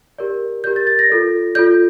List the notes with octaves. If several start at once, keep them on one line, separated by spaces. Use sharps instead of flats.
G4 A#4 D5
G4 A#4 D5 G6
A6
A6
A#6
F4 A4 D5
F4 A4 D5 G6